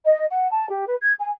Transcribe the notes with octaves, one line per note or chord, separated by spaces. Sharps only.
D#5
F#5
A5
G4
B4
G#6
G#5